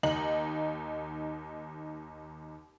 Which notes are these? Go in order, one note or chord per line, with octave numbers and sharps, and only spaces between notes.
D#2 D#4 F#7